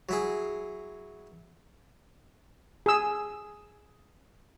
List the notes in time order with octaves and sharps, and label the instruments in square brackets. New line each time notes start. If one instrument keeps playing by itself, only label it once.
[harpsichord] F#3 E4 G#4
[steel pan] G#4 E6